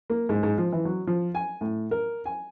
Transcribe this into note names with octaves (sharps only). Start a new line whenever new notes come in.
A#3
G#2
G#2
F3
E3
F#3
F3
G#5
A2
A#4
G#5